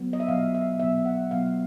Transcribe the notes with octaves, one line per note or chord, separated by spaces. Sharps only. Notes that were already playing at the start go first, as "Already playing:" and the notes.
Already playing: F#3 B3
D#5
E5
B2 F#3 B3 F5
E5
B2 F#3 B3 E5
F#5
B2 F#3 B3 F5